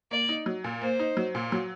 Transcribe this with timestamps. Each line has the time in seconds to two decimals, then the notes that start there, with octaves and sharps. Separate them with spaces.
0.11 A#3 D5
0.29 D#4
0.46 F#3
0.64 A#2
0.81 A#3 C5
0.99 D#4
1.17 F#3
1.35 A#2
1.52 F#3